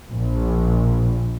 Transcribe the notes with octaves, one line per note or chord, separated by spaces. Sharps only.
A#1